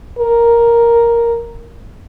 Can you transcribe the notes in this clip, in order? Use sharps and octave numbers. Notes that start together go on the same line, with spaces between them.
A#4